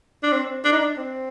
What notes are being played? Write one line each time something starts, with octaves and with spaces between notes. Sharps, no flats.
D4
C4
D4
D#4
D4
C4